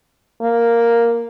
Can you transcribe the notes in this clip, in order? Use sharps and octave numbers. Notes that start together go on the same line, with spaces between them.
A#3